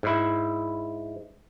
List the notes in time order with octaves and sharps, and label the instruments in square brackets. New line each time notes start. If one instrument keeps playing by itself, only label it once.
[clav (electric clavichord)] G#2 E4